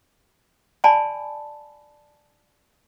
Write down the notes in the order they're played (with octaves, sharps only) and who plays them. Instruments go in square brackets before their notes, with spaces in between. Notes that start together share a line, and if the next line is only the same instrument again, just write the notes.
[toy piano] D5 G#5 A5 B5 C6